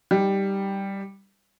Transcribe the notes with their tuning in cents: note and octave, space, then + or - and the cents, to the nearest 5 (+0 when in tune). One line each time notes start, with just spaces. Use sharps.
G3 +0 D#4 +0